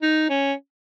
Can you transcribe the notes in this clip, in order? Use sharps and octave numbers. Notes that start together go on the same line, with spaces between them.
D#4
C#4